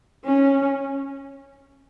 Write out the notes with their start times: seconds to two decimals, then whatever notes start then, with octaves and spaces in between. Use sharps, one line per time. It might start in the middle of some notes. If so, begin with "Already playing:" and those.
0.25 C#4